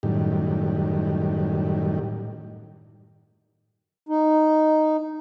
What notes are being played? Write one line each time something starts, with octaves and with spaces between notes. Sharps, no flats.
F#2 A2 D#3 G3
D#4